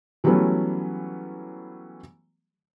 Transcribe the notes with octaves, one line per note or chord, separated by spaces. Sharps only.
E3 F#3 G3 A3 B3 C#4